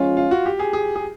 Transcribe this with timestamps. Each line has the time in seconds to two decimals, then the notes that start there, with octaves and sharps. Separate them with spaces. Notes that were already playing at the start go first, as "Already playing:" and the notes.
Already playing: F3 G#3 C#4 F4
0.17 F4
0.31 F#4
0.46 G4
0.59 G#4
0.73 G#4
0.96 G#4